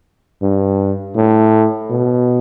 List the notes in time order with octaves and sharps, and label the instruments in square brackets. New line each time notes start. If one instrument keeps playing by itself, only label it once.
[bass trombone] G2
A2
B2